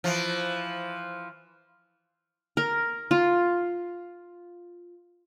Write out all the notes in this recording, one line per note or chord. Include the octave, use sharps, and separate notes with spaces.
E3 F3
A#4
F4